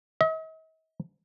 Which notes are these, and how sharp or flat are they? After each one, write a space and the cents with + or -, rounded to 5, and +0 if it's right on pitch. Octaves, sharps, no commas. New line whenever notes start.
D#5 +45